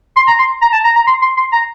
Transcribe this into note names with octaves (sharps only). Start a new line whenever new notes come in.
C6
A#5
C6
A#5
A5
A#5
A#5
C6
C6
C6
A#5